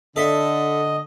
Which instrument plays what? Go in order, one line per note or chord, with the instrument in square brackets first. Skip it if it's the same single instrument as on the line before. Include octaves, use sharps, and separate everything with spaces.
[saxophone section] D3 [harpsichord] A4 E5 [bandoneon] D#5